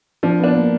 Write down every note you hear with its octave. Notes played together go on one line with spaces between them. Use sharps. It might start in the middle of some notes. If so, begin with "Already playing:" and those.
F3 D4
B3
D4
A#3